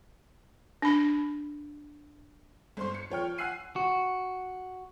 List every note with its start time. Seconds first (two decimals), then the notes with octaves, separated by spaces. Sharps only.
0.82 D4 B5
2.77 G1 C5 C6
2.95 C#7
3.10 F3 C#5 G5 F6
3.38 F#5 G#5 E6 F#6 C7 D#7
3.76 F#4